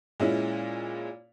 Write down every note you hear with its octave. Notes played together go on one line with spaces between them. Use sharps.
A#2 G#3 C#4 E4